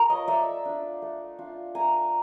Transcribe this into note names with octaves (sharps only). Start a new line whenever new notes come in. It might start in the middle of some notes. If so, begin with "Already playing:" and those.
Already playing: F4 A#4
C#5 D#5
A3 D5 E5
D4 F4
A3
D4 F4
A3 G#5 A#5